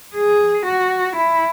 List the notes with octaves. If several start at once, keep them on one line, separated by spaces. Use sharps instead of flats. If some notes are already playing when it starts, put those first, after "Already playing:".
G#4
F#4
E4